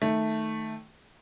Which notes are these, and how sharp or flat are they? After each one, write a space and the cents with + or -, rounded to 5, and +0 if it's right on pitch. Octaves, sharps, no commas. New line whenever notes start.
D#3 +0 A3 +0